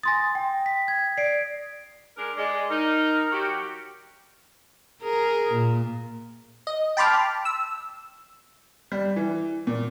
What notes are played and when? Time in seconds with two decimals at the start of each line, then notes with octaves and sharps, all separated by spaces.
0.03 G#5 C6 D#6 A6 A#6
0.35 G5
0.66 B6
0.88 G#6
1.18 D5 C7 D7
2.16 G#3 D4 A#4
2.37 G#3 D5
2.70 D#4 A#4
3.31 F#3 F#4 G4
5.02 G#4 A#4
5.52 A#2
6.67 D#5
6.97 G5 A5 B5 C6 D6 F6
7.45 E6
8.92 G3
9.16 E3
9.67 A#2